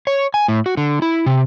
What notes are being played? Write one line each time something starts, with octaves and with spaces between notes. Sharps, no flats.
C#5
G#5
A2
F#4
D3
E4
C3